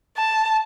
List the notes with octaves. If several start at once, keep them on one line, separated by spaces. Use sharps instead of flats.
A5